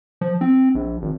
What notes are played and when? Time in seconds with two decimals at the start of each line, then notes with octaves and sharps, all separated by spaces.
0.21 F3
0.41 C4
0.75 A#1
1.02 G#1